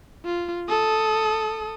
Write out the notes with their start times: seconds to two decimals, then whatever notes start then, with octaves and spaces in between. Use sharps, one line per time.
0.25 F4
0.69 A4 D#6